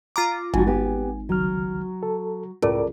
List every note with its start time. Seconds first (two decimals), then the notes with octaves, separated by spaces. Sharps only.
0.16 F4 A#5 D6
0.54 G#1 C3 F3 F#4 G#5
0.66 B3 G4
1.29 C#2 D#3 F#3 F6
2.03 A4
2.62 C#2 A2 A4 A#4 D5